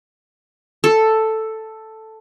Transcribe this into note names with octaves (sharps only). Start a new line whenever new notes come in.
A4